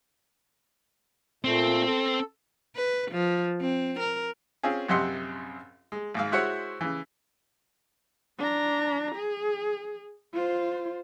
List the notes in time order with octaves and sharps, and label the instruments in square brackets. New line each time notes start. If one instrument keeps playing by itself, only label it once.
[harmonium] A#2 A3 [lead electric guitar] C4
[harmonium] A4
[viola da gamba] B4
F3
C4
A#4
[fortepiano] C4 C#4 F4 G#4
A#1 F#2 C3 D#5 F#5 C6
G#3
G#1 G#2 F5
G#3 E4 F#4 C5 C#5 F#5
C#3 E3
[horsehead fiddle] D4 A#5
G#4
F4 C5